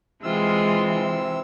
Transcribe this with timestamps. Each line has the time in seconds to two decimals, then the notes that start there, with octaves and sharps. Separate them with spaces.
0.23 C3 E3 G#3 F4 E6